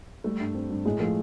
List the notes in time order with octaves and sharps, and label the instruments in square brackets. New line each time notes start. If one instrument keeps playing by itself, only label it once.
[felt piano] G3 [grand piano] A3
[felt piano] G2
C4
G2
[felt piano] A2 [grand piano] G#3
[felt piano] F3 [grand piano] A3